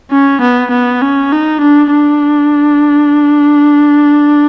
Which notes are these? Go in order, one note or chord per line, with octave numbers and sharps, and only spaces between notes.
C#4
B3
B3
C#4
D#4
D4
D4